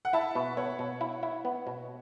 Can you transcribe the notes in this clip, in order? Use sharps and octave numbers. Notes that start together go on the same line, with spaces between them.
F#5
E4 E5 A5
B2
B3 C#5 F#5
B2
E4
E4
B3
B2